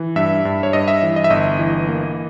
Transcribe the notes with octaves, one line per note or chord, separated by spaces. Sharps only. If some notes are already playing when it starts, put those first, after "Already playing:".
Already playing: E3
G2 E5
G2
C#5
G2 D#5
E5
E3
D#5
E5
G1 D#5
E3
A#3